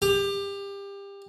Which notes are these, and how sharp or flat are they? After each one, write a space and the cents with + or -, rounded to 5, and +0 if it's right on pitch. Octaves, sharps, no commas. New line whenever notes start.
G4 +25